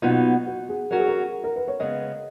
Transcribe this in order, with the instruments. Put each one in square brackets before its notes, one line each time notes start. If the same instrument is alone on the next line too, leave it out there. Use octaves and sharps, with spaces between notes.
[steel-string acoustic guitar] B2 F#3 B3 D#4 [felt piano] F4
[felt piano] F#4
G#4
[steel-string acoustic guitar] F#3 C#4 F#4 [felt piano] A#4
[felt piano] G#4
A#4
A#4
B4
C#5
[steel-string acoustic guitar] C#3 G#3 B3 [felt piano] D#5